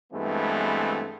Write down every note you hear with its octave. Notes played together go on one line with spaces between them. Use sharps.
G2 E3 G#3 A3 B3 C4